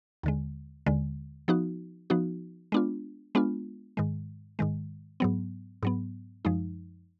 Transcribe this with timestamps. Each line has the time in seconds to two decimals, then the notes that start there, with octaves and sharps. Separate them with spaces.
0.23 D#2 D3 G#3
0.86 D#2 D3 G#3
1.48 F3 B3 D#4 F#4
2.10 F3 B3 D#4 F#4
2.72 G#3 B3 D4 F4
3.35 G#3 B3 D4 F4
3.97 G#2 D#3 G#3
4.59 G#2 D#3 G#3
5.20 G#2 F#3 B3
5.83 G#2 F#3 B3
6.45 F#2 F3 G#3 D#4